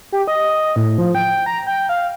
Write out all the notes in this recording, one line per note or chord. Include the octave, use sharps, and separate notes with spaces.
G4
D#5
A2
F3
G5
A#5
G5
F5